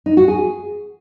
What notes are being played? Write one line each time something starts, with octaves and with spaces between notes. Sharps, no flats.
D#4
F#4
G#4